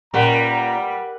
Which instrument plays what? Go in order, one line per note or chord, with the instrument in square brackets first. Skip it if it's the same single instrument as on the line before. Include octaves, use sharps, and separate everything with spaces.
[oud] A#2 C#4 [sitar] G3 [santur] A#4 B4 F#5 [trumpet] A#5